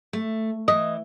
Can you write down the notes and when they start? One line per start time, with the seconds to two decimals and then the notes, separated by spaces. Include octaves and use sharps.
0.13 A3
0.68 E3 D#5